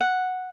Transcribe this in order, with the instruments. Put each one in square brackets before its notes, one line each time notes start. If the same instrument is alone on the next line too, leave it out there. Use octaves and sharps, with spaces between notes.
[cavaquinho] F#5